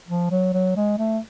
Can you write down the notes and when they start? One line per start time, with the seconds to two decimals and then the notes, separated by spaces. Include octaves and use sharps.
0.08 F3
0.31 F#3
0.53 F#3
0.76 G#3
0.98 A3